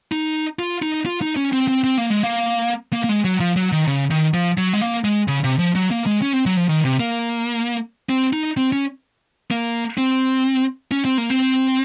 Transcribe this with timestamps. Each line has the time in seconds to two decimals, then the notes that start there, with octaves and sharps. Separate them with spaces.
0.12 D#4
0.59 F4
0.82 D#4
1.06 F4
1.22 D#4
1.37 C#4
1.53 C4
1.68 C4
1.84 C4
1.98 A#3
2.10 G#3
2.23 A#3
2.93 A#3
3.04 A#3
3.09 G#3
3.25 F#3
3.40 F3
3.56 F#3
3.72 D#3
3.87 C#3
4.11 D#3
4.34 F3
4.58 F#3
4.73 G#3
4.81 A#3
5.04 G#3
5.28 C#3
5.44 C3
5.59 F3
5.75 F#3
5.91 A#3
6.06 G#3
6.22 C#4
6.33 C4
6.46 F#3
6.57 F3
6.69 D#3
6.85 C3
7.00 A#3
8.09 C4
8.33 D#4
8.57 C4
8.72 C#4
9.51 A#3
9.98 C4
10.91 C#4
11.05 C4
11.18 A#3
11.30 C4